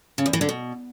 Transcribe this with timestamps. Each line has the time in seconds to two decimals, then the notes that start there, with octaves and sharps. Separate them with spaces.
0.18 C#3
0.26 E2
0.33 E3
0.41 D3
0.49 B2